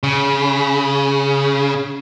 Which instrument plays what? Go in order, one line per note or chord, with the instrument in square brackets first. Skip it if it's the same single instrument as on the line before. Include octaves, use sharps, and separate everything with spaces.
[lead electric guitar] C#3